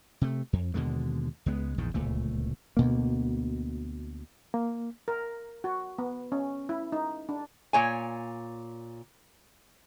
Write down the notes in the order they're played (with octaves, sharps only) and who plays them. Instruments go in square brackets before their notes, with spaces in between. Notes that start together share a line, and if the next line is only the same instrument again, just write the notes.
[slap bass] C3 A3
F2
D#2 B2 D3 G#3
C#2 G#3 B3
A#1 E2 G#2 D#3
D1 C#2 A#2 A3
D2 B2 A#3
[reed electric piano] A#3
[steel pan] A#4
F#4
B3
C#4
E4
D#4
D4
[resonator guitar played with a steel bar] A#2 C#5 G#5